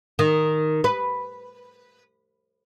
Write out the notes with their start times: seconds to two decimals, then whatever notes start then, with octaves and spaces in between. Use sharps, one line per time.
0.19 D#3
0.84 B4